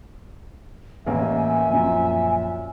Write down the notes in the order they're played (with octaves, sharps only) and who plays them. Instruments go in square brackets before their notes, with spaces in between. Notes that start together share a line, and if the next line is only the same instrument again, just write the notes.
[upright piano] A1 A#3 C#4 [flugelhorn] E5 [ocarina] G#5
[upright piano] F#2 A#2 F3